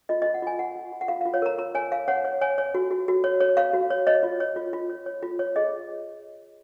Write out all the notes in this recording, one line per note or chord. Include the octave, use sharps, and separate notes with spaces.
F4 D#5
F4 D#5
F#5
F4 G#5
F4 F#5
F4
F4
F#5
F4 F5
F4 F5
C#5
A#4 A#5
F4 A#5
C#5 G#5
C#5 F5
C#5 F#5
C#5
C#5 G#5
C#5
F#4
F#4
F#4
C#5
C#5
C#5 F5
F#4
C#5
C#5 D#5
F4
C#5
F4
F4
C#5
C#5
F4
C#5
G#4 D#5